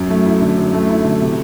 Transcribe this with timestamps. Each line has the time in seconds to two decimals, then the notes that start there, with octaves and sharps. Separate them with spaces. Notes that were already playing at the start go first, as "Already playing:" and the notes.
Already playing: F#2
0.10 A3
0.26 E4
0.41 D3
0.58 F#2
0.73 A3
0.90 E4
1.05 D3
1.21 C3